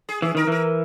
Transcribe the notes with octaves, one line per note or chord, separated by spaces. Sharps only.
G#4
E3 G#4
D#3 A#4
E3 A#4